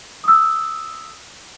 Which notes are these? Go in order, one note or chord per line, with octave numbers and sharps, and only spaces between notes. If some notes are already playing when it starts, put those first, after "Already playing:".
D#6 E6